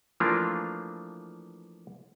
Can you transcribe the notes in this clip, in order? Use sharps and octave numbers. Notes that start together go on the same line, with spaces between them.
E3 F3 A3 A#3 D4 F4